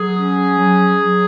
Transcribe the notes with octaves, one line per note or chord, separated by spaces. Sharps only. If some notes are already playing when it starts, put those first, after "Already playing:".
Already playing: F#3 G#4
C#4
F#3
F#3